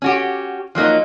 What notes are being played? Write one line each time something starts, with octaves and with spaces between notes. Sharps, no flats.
C#4 F#4 G4
F3 F#3 A#3 D#4